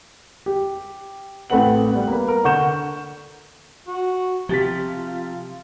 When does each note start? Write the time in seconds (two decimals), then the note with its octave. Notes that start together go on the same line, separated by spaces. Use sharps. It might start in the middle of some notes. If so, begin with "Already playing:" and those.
0.46 G4
1.50 A1 A3 C4 B4 F#5 F#7
1.91 G3 B3
2.08 A#3 B4
2.28 A#4
2.44 D3 F#5 C#6 G6 E7
3.87 F#4
4.49 C3 F3 F4 A6 B6